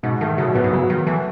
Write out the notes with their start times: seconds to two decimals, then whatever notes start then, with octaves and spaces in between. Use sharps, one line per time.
0.03 G#2 B2
0.21 D#3 A3
0.38 C#3 F#3
0.46 B2
0.55 A2 B3
0.64 G#2
0.73 C#3 F#3
0.90 D#3 F#3
1.06 E3 A3